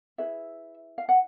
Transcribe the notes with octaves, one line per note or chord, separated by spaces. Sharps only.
E4 G#4 B4 E5
F5
F#5